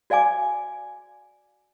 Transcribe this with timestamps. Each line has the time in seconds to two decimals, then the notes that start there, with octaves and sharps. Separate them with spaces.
0.10 F#4 D5 F5 G#5 D6